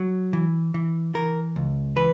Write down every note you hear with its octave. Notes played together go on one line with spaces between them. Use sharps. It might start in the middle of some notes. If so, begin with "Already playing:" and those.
Already playing: F#3
E3
E3
E3 A#4
C#2
E3 B4